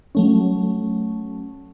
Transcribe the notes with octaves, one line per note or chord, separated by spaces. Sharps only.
F#3 A3 C#4